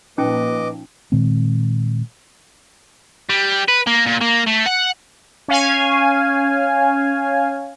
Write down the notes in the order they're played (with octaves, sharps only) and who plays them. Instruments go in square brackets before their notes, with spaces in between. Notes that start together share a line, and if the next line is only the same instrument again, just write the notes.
[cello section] A#2 F3 [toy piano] C#4 D#4 G5 [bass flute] B4 [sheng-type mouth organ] D#5 D6
[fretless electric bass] A#2 D#3 G#3 C4
[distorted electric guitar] G3
B4
A#3
A#2
A#3
A3
F#5
[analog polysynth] C#4 F5 G#5